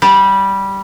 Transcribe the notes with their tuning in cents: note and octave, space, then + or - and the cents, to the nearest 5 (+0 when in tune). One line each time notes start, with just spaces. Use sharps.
G3 -5